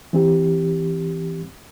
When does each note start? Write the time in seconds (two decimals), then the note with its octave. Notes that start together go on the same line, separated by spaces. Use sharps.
0.13 E3 C4 G4